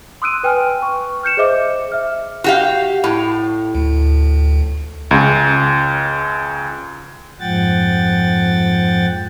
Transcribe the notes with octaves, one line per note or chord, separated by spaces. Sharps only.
C6 D#6 E6 F#6 D7 D#7
B4 G5 G#5 F6
C#6
F6 G6 C#7 E7
G#4 C5 D#5 E5 D6
E5 F6
F#4 G4 F5
A2
D2
C#2 C#3
F2 G#2 F3 F#5 G5 A6